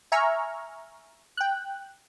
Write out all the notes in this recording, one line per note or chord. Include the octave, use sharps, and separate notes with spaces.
E5 G#5 A#5 C#6 F6
G5 F#6